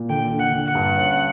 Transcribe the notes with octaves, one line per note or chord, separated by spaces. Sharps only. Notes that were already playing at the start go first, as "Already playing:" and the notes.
Already playing: A#2
D3 G5
D3
F#5
D3
F#5
G2
C#4